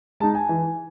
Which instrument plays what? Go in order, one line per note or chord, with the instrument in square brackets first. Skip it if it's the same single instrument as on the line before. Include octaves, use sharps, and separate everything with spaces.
[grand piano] G#3 A5
D#4
G#5
E3